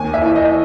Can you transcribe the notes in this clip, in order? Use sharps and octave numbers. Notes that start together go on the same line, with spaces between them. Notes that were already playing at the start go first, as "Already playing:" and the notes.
Already playing: D#2 G#5
E5
E3
D#5